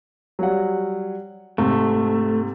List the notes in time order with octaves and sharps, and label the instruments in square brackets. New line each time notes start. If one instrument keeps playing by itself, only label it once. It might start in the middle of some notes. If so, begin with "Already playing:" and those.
[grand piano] F#3 G3 F#5
[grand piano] G#2 C3 [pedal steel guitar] A3